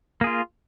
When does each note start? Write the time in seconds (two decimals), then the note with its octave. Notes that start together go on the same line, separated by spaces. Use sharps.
0.21 A#3
0.24 G#4
0.27 F4